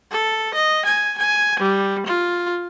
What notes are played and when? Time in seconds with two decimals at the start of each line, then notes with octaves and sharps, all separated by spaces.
0.11 A4
0.55 D#5
0.86 G#5
1.18 G#5
1.60 G3
2.07 F4